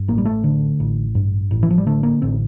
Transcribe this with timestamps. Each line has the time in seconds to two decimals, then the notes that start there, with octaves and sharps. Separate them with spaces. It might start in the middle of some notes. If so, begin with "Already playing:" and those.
Already playing: G2
0.08 A1 A#3
0.18 G3
0.25 A3
0.44 D3
0.80 A1
1.15 G2
1.51 A1
1.63 E3
1.70 F3
1.78 G3
1.86 D3 A3
2.03 A#3
2.22 A1 C4